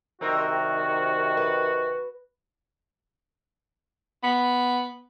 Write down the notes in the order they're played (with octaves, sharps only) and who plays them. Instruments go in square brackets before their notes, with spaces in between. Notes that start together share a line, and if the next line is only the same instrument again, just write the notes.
[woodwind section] C2 C3 D#3 [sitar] C4 D#4 A#4 [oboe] F#4
[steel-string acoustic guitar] B4
[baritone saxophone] B3